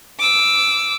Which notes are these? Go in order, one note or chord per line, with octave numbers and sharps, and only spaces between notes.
D6 E6